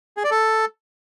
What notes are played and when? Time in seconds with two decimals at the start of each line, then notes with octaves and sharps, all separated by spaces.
0.17 G#4
0.24 D5
0.31 A4